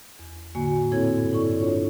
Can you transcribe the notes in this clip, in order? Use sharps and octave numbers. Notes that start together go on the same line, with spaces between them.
E2
A2 D3 A#3 F#4 G#5
A#2 C4 E4 A4 C#5 G#6
G2
E4 A4 D5 C#6
D4 F4 C#5